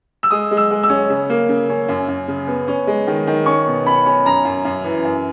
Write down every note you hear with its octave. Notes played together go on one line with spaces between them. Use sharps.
E6
G#3 D#6
G#3
E6
G#3
E6
C#4
C#3
A#3
C#3
C#4
F#2
F#2
C#3
B3
C#4
G#3
D#3
D#3
C#4 C#6
B2
C#4 B5
C#4
F#2 A#5
F#2
F#2
E3
F#2